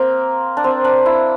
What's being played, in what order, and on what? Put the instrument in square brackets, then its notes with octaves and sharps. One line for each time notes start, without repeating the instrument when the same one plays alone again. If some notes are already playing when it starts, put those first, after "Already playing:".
Already playing: [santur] A#3 C4
D4
C4
D4
E4